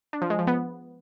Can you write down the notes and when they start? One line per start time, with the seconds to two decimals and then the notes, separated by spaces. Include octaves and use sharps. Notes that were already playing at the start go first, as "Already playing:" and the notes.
0.13 D4
0.22 F3
0.30 G#3
0.39 F3
0.47 B3